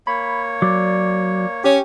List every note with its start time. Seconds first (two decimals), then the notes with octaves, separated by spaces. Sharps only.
0.07 A#3 C#5 B5
0.62 F#3 D5
1.64 C#4 G4